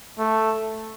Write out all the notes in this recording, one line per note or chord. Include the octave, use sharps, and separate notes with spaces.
A3